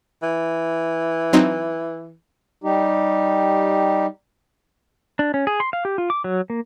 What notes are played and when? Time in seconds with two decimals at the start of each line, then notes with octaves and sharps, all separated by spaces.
0.23 E3
1.33 F#3 C4 D#4
2.64 G3 D#4 G4
5.19 D4
5.34 C#4
5.47 G#4
5.60 C6
5.73 F5
5.85 G4
5.98 F4
6.10 D6
6.24 F#3
6.50 A#3